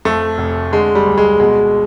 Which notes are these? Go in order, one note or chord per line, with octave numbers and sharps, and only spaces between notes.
F2 A3
F1
D3 G#3
G3
D2
G#3
B2 G#3